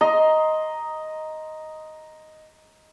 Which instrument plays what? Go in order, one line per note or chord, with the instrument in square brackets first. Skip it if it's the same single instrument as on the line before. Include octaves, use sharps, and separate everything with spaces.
[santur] D#5 A#5 C6